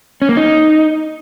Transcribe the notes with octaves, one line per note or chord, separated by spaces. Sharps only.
C#4
A#3
D#4